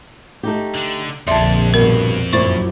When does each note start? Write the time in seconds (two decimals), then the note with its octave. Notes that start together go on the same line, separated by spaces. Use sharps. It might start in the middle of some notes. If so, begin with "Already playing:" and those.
0.43 A3 D#4 G4
0.75 D3
1.27 A#1 F2 A#2 D3 D5 E5 A5 C6
1.74 G2 B2 A#4
2.33 F#2 A#2 E4 C5 D5 C#6